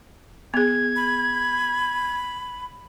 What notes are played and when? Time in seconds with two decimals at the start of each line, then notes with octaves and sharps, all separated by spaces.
0.54 B3 G#4 G#6
0.96 B5